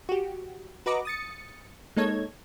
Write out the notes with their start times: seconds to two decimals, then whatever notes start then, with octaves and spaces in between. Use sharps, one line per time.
0.09 F#4 G4
0.86 F#4 B4 D#5 A#5 D6
1.05 D#6 A6 C#7
1.96 G#3 A#3 D#4 A4 C#5 G#6